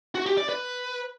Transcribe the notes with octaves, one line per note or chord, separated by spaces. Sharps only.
F#4
G4
D5
B4